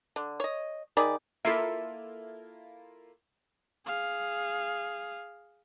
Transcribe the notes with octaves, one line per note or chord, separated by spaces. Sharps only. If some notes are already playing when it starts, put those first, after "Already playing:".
D3
C#5 D#5
D#3 G#4 D5 B5
A#3 E4 F4 A4 E5
G#4 F5